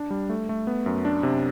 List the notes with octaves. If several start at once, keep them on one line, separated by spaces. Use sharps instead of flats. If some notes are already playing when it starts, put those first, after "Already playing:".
Already playing: D4
G3
A3
A3
B3
F#2
D4
C3